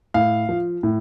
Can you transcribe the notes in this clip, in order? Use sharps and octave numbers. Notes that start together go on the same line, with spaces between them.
A2 F5
F3
A2